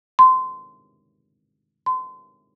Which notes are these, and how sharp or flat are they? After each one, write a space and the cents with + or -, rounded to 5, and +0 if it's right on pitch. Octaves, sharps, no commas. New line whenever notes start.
C6 -20
C6 -30